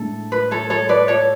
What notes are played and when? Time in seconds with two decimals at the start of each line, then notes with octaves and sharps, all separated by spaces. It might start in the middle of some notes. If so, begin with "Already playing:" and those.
Already playing: A2 G#3 D4 A4
0.32 B4
0.51 A4 C#5
0.70 A4 C#5
0.89 B4 D5
1.08 A4 C#5